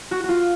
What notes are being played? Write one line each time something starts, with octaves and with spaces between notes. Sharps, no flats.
F#4
F#4
F4